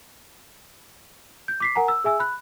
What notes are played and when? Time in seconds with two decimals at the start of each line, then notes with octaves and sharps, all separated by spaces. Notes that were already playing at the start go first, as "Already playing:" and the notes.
1.48 G6
1.60 D6 B6 C7
1.76 A#4 F#5 G#5 A#5
1.88 E6
2.04 G#4 E5 G#5 E6
2.20 B5 F#6